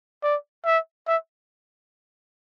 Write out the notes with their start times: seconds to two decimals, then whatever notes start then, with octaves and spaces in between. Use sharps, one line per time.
0.23 D5
0.65 E5
1.08 E5